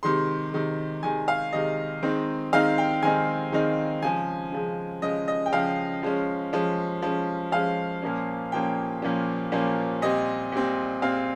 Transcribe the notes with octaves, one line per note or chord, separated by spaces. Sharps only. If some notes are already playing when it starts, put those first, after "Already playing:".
C3 D#3 G#3 C6
C3 D#3 G#3
C3 D#3 G#3 G#5
F5
C3 D#3 G#3 D#5
D#3 G#3 C4 D#4
D#3 G#3 C4 D#4 F5
G5
D#3 G#3 C4 D#4 G#5
D#3 G#3 C4 D#4
C#3 F3 G#3 G#5
C#3 F3 G#3
C#3 F3 G#3 D#5
D#5
G5
C#3 F3 G#3 F5
F3 G#3 C#4
F3 G#3 C#4
F3 G#3 C#4
F3 G#3 C#4 F5
A#2 F3 A#3 C#4
A#2 F3 A#3 C#4 G5
A#2 F3 A#3 C#4
A#2 F3 A#3 C#4
A#2 G3 C4 D#5
A#2 G3 C4
A#2 G3 C4 F5